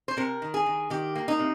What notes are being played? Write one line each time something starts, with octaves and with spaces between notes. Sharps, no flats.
C5
C3 A#4
D#3
G#4
D#3
D#3 G4
A#3
D#4
C3